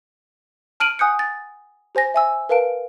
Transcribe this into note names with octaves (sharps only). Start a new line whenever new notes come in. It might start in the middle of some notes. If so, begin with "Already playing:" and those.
A5 F6 D7 D#7 F#7
F#5 G#5 D#6 F#6 G6 C#7
A6
G4 C5 G#5 A#6
E5 G#5 E6
A#4 B4 F5 A5 D7